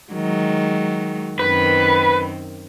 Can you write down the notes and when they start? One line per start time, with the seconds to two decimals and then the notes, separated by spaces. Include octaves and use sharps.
0.12 D#3 F#3 G#3
1.39 F#2 D#3 C4 B4